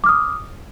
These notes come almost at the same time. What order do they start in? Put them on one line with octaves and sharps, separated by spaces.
D6 F6 D#6